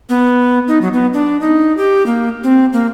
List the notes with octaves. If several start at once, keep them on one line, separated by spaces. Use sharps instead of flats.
B3
D#4
F#3
B3
D4
D#4
G4
A#3
C4
A#3